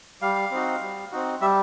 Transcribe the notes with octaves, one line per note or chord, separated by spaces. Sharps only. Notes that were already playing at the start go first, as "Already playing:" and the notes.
G3 F5
C4 D#4 F#4
G3
C4 D#4 F#4
G3 E5